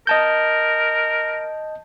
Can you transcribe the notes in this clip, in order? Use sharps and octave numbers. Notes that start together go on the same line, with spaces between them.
A#4 D#5 A5 G6